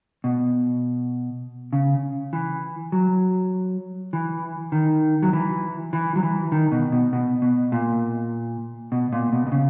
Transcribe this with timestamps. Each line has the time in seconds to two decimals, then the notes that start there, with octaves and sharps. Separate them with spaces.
0.24 B2
1.73 C#3
2.33 E3
2.92 F#3
4.13 E3
4.72 D#3
5.23 F#3
5.33 E3
5.93 E3
6.16 F#3
6.23 E3
6.52 D#3
6.72 B2
6.92 B2
7.13 B2
7.42 B2
7.72 A#2
8.92 B2
9.13 A#2
9.33 B2
9.47 B2
9.52 C#3